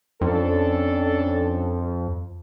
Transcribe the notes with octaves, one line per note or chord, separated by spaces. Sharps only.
F2 C#4 D4 A4